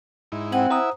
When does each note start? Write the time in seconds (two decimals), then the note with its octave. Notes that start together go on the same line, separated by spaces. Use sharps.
0.32 G#2 D#4 E4
0.52 C4 F#5 G#5
0.70 E4 C5 E5 A#5 D#6